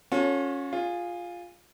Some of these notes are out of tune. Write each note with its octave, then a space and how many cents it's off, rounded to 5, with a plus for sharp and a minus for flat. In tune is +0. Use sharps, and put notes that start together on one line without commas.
C#4 +0 F4 +45 A4 +0
F4 +5 G#4 -15